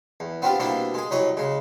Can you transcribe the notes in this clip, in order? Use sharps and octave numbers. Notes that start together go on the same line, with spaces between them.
E2
B3 C4 D4 F4 G4
B2 G3 A#3 C4 D4 E4
G#3 G#4
C2 F#3 C#5 D#5 B5
C#3 G#3